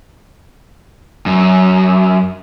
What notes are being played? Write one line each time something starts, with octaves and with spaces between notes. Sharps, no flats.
F#2